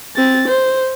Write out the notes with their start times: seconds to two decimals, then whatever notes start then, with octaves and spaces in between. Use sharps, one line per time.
0.16 C4 A6
0.48 C5